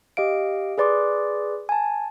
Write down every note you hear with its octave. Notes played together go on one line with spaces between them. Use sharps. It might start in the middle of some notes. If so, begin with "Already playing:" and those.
G4 D#5 F5 D7
G#4 B4 D5 C6 D6
G#5 A5